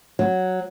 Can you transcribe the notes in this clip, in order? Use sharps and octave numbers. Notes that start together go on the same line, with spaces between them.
F#3